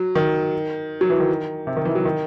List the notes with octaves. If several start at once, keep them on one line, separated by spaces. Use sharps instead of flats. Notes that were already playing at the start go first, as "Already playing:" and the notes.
Already playing: F#3
D#3
F#3
E3
D#3
C3
D#3
E3
F#3
D#3